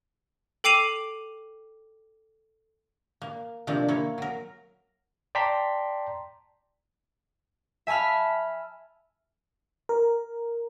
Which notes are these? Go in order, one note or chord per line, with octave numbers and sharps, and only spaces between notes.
A4 G5 D6 C7 D#7 F7
A#3
C3 D#3 F3 A3 A#3 D4
A#3 E4 C#5
F#3 A#4
D5 G5 A5 A#5 C6 B6
E5 G#5 A5 B5 F6
A#4